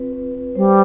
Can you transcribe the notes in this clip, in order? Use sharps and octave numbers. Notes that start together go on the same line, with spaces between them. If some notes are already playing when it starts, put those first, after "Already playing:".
Already playing: C4 F4 B4
B4
B4
G3 C5